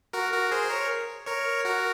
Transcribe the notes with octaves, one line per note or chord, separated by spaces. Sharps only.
F#4 A#4
F#4 A#4
G#4 C5
A#4 C#5
A#4 C#5
F#4 A#4